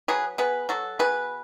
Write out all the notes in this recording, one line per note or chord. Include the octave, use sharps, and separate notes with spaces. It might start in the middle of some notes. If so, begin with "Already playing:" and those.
F#3 G#4 B4
B3 G#4 B4
F#3 F#4 A4
B2 G#4 B4